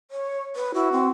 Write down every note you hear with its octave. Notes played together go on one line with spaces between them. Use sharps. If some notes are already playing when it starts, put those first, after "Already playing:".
C#5
B4
E4 F#4
C4